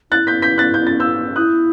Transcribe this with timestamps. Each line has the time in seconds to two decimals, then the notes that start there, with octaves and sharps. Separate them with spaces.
0.11 E4 F#6 A6
0.27 G6 B6
0.42 G6 B6
0.58 F#6 A6
0.74 G6
0.87 A6
1.00 E6 G6
1.36 E4 D#6 F#6